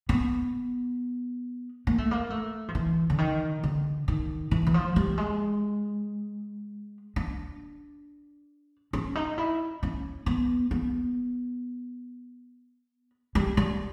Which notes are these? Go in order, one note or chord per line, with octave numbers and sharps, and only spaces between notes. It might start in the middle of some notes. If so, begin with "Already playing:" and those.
B3
A#3
A3
A#3
A3
F3
E3
D3
D#3
D3
D#3
E3
E3
F3
G3
G#3
D4
C#4
D#4
E4
C#4
B3
B3
G3
G3